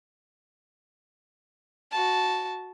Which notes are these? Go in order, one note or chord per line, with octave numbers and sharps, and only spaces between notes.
F#4 A5